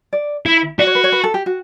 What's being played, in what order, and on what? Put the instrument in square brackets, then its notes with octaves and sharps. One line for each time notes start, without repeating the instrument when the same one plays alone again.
[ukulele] D5
[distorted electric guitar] E4 [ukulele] E5
[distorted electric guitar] F#4 [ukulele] D5
[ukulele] C#5
B4
C#5
B4
A4
G4
F#4